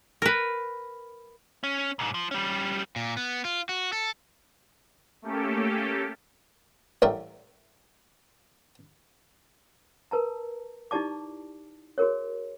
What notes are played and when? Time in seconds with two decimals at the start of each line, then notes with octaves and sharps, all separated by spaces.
0.22 A#4 B4
1.64 C#4
1.99 B1 G#2
2.14 F3
2.31 G3 C#4
2.96 A#2
3.17 B3
3.45 F4
3.69 F#4
3.93 A4
5.22 A3 A#3 C#4 G4 A4
7.02 A1 A2 G3 A#4 E5
10.11 A#4 B4 A5 A#5
10.91 D#4 E4 G4 D5 A5 D6
11.98 F#4 G#4 A#4 C#5